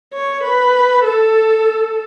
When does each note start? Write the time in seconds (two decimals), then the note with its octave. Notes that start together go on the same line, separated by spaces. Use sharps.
0.13 C#5
0.44 B4
1.04 A4